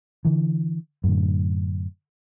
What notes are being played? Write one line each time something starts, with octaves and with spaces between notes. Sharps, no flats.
D3 E3
F#2 A2 D3